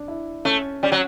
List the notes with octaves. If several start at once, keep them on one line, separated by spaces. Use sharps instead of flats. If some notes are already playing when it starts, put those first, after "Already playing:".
Already playing: D4
E4
A3 C#4
G3 C#4
F#3